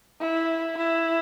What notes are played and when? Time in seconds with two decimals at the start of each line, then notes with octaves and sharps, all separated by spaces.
0.20 E4
0.77 E4